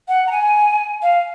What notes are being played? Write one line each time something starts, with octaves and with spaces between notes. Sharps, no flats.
F#5
A#5
G#5
F5